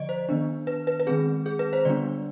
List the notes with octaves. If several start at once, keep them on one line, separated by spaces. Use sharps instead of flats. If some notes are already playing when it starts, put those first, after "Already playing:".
Already playing: D3 F3 D5 D#5
C5
D#3 B3 D4
B4
B4
B4
D#3 G#3 C4 G#4
G#4
B4
C5
D3 G3 B3 D4 D5